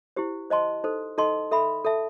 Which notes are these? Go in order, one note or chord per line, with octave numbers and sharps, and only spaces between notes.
E4 G4 C5
C5 D#5 A5 C6
D#4 A4 C5
D#4 A4 D#5 A5 C6
A4 E5 B5
A4 E5 A5